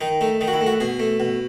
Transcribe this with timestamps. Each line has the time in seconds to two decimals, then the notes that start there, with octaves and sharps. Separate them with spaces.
0.01 D#3 D#4
0.21 A3 D#4
0.41 D#3 D#4
0.48 F#4
0.53 E4
0.61 A3
0.67 F#4
0.80 B2 G#4
1.00 A3
1.20 B2